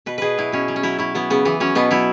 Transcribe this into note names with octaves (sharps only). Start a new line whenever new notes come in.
B2 B4
B2 G#4 B4
F#3 E4
B2 C#4
F#3
C#4
F#3 E4
F#3 E4
F#3 B3
C#3 B3
E3 B3
F#3 C#4
B2 B3
F#3 E4